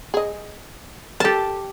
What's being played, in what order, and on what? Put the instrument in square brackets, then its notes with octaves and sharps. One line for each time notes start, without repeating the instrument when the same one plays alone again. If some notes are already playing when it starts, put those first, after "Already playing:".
[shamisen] G#4 D#5
[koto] G4 A5 [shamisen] A4 A#4